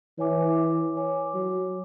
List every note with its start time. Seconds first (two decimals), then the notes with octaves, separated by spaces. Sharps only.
0.18 E3 C#5 G#5 D6
0.97 C#5 G#5 D6
1.34 F#3